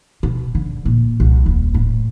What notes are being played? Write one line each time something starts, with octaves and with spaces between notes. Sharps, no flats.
B2
D3
A#2
C2
D#1
A2